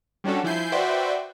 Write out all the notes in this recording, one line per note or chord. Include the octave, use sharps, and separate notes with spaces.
G3 C#4 D4 F#4 A4
F3 E4 G#5 G6 C7
F#4 B4 C5 D5 E5 G5